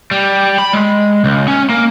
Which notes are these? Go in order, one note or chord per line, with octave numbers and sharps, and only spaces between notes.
G3
B5
G#3
C#2
C#4
A#3